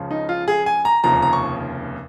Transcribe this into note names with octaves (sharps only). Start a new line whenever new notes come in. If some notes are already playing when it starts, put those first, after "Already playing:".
Already playing: C#2 C#3 F3
D#4
F4
G#4
G#5
A#5
F1 D#2 C#3 F3 A#5
A#5
C#6